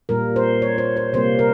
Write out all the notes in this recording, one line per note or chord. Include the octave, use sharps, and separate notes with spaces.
A#2 G3 A#3 A#4
C5
C#5
C5
C5
C3 G3 A#3 C5
A#4